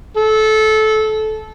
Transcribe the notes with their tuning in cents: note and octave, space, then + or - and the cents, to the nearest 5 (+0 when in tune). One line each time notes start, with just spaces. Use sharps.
A4 -20